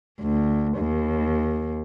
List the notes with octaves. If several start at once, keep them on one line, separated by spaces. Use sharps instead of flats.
D2
D#2